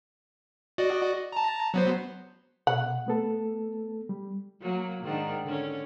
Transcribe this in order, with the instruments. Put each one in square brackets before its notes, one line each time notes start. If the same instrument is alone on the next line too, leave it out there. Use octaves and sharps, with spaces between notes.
[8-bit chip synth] F#4 D5 D#5
A5 A#5
F#3 B3 C5
[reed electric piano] B2 [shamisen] F#5
[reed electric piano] A3 B3 A4
G3
[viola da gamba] F#3 A#3
G#2 D#3 D4
D3 C#4